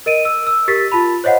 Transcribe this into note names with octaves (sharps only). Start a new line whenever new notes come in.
A#4 D#5 D7 D#7
E6
E6
G4 A#4 A6 B6
F4 A5 B5
C5 C#5 D#5 F5 F#5